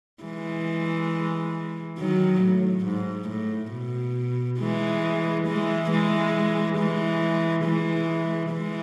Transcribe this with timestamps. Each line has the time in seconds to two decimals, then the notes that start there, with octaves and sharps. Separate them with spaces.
0.24 E3 G#3
1.98 D#3 F#3
2.42 A2
2.85 G#2
3.29 A2
3.73 B2
4.59 E3 G#3
5.47 E3 G#3
5.91 E3 G#3
6.78 E3 G#3
7.65 E3 G#3
8.52 E3 G#3